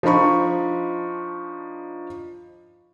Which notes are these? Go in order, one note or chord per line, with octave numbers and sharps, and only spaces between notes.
F3 D4 D#4 A#5 B5 C#6